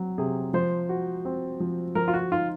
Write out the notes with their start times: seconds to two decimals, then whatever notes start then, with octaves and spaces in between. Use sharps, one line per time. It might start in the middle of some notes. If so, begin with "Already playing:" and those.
Already playing: F#3 C4
0.18 C3 G#4
0.54 F3 C5
0.89 F#4
1.25 C4
1.60 F3
1.95 F3 A#4
2.08 F4
2.14 F#4
2.32 D#4 F4